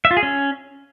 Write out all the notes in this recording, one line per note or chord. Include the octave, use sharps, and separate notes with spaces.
E5
F4
G#4
C#4